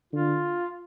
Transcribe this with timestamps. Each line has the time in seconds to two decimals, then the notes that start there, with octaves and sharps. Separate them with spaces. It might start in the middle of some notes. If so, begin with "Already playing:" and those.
0.13 D3 F4